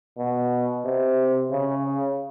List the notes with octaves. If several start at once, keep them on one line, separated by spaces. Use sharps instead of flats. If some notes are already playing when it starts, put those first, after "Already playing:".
B2
C3
C#3